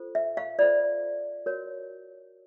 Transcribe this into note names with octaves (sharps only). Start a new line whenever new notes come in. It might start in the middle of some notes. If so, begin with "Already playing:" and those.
Already playing: F4 A4 C5
E5
F5
F4 A4 C5 D5
F#4 A#4 C#5